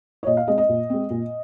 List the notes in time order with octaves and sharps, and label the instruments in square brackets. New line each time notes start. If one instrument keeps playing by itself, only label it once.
[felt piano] C#5
A#2 D#5
F5
G#3 C4 D#5
D#5
A#2
G#3 C4
A#2